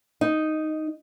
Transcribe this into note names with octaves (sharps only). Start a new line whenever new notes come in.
D#4